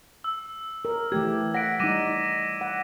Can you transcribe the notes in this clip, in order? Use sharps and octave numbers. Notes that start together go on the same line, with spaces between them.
E6
A#4
E3 A3 G4 G#6
F#5 A#6 B6 D7
G3 D#4 D6 A#6 D#7
F#5